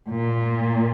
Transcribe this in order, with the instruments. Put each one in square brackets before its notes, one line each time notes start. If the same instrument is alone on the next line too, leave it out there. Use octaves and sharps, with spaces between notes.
[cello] A#2